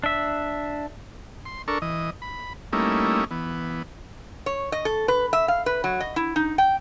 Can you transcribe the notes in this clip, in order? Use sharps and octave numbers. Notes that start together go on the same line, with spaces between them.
D4 E5
C6
D4 A4 A#4 C#6
E3 D#5
B5
G3 A3 A#3 C#4 D#4 E4
E3 B3
C#5
D#5
A4
B4
E5
F5
B4
F#3
D#5
E4
D#4
G5